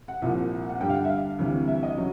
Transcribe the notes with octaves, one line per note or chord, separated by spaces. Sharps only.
F#5
C2 A#2 F3 F#5
F#5
G2 D3 G3 G5
F5
F#5
E5
F5
D2 C3 E3 G3
E5
D#5
C#3 F#3